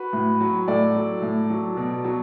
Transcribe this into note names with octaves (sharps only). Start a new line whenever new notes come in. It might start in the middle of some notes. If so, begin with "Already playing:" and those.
Already playing: F#4 B4
A2
F#3
A2 A4 D5
F#3
A2
F#3
B2
F#3